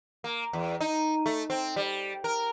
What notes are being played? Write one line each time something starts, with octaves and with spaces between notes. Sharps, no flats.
A#3
E2
D#4
A3
C4
G3
A#4